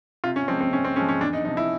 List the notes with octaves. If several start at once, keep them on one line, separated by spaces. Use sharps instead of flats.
C3 F4
C#4
F3 G#3 C4
C4
C3 C#4
C4
F3 G#3 C#4
C#4
E2 D4
D#4
C3 F3 D#4
E4